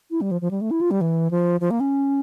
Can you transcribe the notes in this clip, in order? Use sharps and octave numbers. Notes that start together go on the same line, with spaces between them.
E4
G3
F3
F3
G3
A3
E4
F4
G3
E3
F3
F3
A#3
C#4